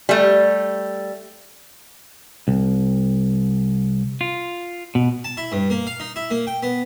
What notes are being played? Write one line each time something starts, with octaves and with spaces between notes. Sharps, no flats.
G3 A3
C2
F4
B2
A5
E4
G2
A#3
F5
D#4
E4
A#3
G5
B3